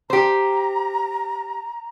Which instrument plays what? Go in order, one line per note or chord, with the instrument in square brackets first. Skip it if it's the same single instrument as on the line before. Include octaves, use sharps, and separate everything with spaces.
[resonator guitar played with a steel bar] G4 C5 [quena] A#5